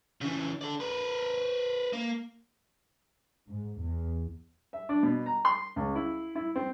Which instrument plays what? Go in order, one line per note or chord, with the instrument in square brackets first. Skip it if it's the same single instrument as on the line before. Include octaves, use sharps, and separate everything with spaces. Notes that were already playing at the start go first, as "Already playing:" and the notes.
[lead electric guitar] C#3 E3
A4 D5
A#4 B4
A#3
[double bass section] G#2
E2
[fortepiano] E5
D4
B2
A#5
C6
C#2
E4
E4
C4